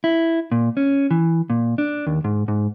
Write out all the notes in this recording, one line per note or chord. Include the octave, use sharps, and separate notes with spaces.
E4
A#2
C#4
E3
A#2
D4
D#2
G#2
G#2